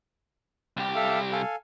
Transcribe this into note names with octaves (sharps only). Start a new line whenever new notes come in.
C2 G4
A4 E5 F5
A4 F5 G#5